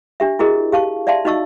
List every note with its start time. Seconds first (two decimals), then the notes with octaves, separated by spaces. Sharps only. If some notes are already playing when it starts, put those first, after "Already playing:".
0.20 D4 G4 E5
0.39 E4 F#4 G#4 A#4 D#5
0.72 G4 F5 A5 C#6
1.07 D5 E5 F5 A5 C6
1.25 D#4 F#4 D#5 C#6 E6